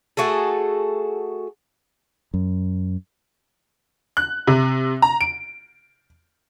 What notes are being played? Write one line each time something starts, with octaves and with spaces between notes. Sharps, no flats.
A3 F#4 G#4 A4
F#2
F#6
C3
A#5
D7